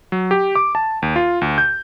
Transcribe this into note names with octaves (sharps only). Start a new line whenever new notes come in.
F#3
G4
D6
A5
D#2
F4
D2
G6